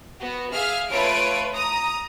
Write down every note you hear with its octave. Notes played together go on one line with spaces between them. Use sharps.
B3 F#4
G#4 E5 F5 F6
A3 F4 B4 C#5 D7
A#5 D#6